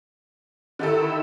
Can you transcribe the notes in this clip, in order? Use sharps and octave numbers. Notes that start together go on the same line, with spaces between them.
D3 D#3 E4 G4 A4 E6